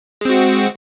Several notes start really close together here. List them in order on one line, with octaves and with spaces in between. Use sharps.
G#3 C4 F#4